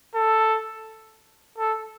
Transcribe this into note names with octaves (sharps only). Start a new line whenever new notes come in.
A4
A4